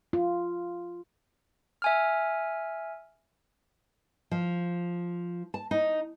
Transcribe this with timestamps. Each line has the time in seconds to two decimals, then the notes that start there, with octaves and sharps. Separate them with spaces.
0.13 F4
1.82 E5 G#5 F6
4.31 F3
5.54 A5
5.71 D#4